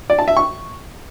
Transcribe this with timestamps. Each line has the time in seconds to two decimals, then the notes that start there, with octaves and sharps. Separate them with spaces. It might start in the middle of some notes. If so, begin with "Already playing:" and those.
0.10 D5
0.19 A5
0.28 E5
0.37 C#6